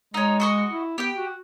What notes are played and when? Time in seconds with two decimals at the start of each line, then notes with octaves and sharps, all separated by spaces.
0.14 G#3 D#4 C#5
0.40 F#4 D#5 C#6
0.70 E4
0.98 B3 G4 G5
1.16 F#4